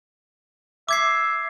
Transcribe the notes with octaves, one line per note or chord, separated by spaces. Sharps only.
E5 D6 G#6 C7